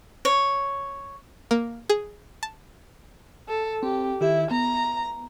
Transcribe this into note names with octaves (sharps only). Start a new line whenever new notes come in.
C#5
A#3
G#4
A5
A4
C4 G4
D#3 E4 G4
B3 A#5